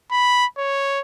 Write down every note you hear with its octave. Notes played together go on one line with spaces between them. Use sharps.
B5
C#5